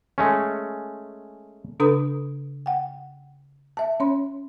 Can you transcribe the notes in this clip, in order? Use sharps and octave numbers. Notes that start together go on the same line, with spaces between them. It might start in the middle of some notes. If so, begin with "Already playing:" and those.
G#3 A3 C#4
C#3 D4 A4 B4 A#5 D#6
F#5 G5
E5 A5
C#4 C#5 C6